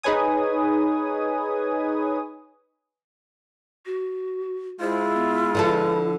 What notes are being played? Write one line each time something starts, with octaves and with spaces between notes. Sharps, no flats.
D#4 G#4 B4 C#5 G#5 D#6
F#4
G#3 E4 F4 C5
B3
D3 F3 A4 B4